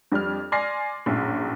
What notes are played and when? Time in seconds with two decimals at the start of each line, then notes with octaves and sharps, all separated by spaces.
0.12 F2 G3 D4 F6
0.52 D5 G#5 C6 F6 A#6 C7
1.06 A#1 F#2 A2